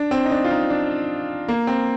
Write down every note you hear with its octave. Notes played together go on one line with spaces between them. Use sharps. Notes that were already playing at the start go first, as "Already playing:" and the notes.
Already playing: D4
C4
D#4
D4
F4
D#4
D4
A#3
C4